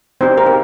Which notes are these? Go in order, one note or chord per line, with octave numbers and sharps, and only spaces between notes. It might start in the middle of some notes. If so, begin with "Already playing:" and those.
C4 D#4 G4 C5
A#4
G4